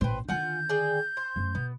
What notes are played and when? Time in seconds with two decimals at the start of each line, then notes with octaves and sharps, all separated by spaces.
0.01 A1 A#2 B4 C5 G5
0.29 D3 D#3 F4 F#5 G#5 G6
0.69 G#4 D5 G5
1.17 C5
1.36 F#2 A3
1.55 B2 B3